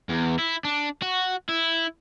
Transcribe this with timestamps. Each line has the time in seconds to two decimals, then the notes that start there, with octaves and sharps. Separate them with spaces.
0.10 E2
0.39 E4
0.64 D4
1.02 F#4
1.49 E4